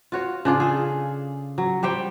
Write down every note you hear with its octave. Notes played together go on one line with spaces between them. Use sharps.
F4 F#4 C#5
C#3 D4 F4
G#4 A4
F#3
G3 G4 C5 G5